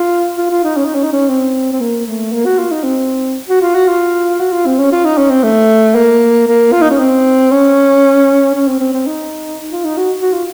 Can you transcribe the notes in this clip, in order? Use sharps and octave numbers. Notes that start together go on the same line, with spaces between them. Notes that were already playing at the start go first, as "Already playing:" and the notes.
Already playing: F4
F4
F4
D#4
C#4
D#4
C#4
D#4
C#4
C4
C4
A#3
A3
A#3
F#4
F4
D#4
C4
F#4
F4
F#4
F4
F#4
F4
C4
C#4
F4
D#4
C#4
C4
A3
A#3
A#3
F4
D#4
C#4
C4
C#4
C#4
C4
C4
C4
D#4
F4
D#4
F#4
F#4
F4